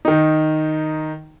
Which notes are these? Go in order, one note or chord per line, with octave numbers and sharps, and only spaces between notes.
D#3 D#4